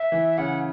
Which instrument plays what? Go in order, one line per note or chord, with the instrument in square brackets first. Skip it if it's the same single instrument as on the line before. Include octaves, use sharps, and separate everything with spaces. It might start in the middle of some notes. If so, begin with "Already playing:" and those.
Already playing: [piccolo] E5
[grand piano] E3
[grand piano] C#3 [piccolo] F#5